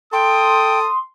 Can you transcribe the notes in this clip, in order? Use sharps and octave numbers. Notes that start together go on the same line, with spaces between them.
A4 G5 C6 D#6